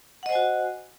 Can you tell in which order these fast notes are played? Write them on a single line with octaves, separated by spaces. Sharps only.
F#5 D#5 C5 G#5 F#4